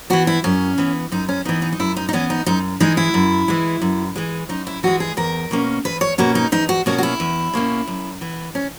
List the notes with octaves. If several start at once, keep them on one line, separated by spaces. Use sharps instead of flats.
E3 B3 F#4
E4
F#2 C#4
E3 B3
F#2 D#4
C#4
E3 B3 D#4
D#4
D#4
F#2 E4
D#4
D#4
E3 B3 C#4
D#4
F#2 D#4
E3 G#3 D#4
E4
F#2
E3 G#3
F#2
E3 G#3
F#2 D#4
E4
E3 G#3 F#4
G#4
E2 A#4
B2 A#3 C#4
E2 B4
C#5
B2 A#3 C#4 F#4
D#4
E2 D#4
F#4
B2 A#3 C#4 F#4
F#4
E4
E2
B2 A#3 C#4
F#2
E3 B3
C#4